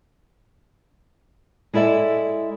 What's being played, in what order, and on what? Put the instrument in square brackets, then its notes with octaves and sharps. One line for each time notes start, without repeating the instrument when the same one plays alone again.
[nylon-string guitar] G#3 E4 A4 D5 E5